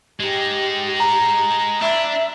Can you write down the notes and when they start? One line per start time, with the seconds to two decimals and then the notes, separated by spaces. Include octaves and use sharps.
0.20 G#3 D#4 G4
1.00 A#5
1.81 D4 E5